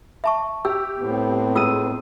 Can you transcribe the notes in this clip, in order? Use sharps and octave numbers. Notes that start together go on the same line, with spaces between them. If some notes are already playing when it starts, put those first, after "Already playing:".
E5 A5 C#6
G4 E6
A2 B3 C4
G#2 F4 D#6 E6 D#7